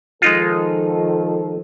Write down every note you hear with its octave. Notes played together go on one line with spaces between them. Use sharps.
D#3 F3 G#3 D#4 F4 A4